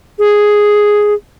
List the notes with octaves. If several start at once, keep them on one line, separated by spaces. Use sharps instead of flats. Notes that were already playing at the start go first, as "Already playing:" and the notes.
G#4